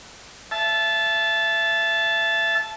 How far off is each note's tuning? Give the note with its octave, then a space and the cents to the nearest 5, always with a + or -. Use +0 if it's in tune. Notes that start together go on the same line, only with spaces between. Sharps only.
E5 +25 A5 -20